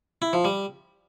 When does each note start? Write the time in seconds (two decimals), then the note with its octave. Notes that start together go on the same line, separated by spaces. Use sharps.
0.22 E4
0.33 F3
0.45 G3